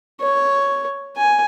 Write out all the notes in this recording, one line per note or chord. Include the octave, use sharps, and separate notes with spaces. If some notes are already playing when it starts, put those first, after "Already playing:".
C#5
G#5